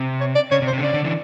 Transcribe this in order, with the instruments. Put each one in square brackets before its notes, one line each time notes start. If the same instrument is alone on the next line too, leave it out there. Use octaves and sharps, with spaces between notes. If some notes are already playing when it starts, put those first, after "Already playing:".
Already playing: [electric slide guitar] C3
[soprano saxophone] C#5
D5
[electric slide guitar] C#3 [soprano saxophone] C#5
[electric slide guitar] C3
[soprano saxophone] C5
[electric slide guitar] C3
D3
[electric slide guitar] C#3 [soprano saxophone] D5
[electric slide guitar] D3
D3 E3